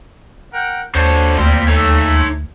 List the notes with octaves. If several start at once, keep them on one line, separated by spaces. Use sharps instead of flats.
A#4 F#5 G5
D#2 D3 C5 C#5 A5
D2 G3 A#3 C4 C6
A3 D#4 C#5